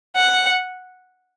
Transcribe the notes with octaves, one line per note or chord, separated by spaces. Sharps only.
F#5